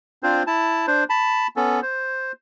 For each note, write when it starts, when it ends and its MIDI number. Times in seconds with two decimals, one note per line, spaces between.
0.23 0.43 60
0.23 0.43 62
0.23 0.43 65
0.23 0.43 72
0.47 0.86 64
0.47 0.86 81
0.87 1.04 62
0.87 1.04 72
1.10 1.47 81
1.10 1.47 83
1.56 1.80 59
1.56 1.80 61
1.56 1.80 69
1.82 2.32 72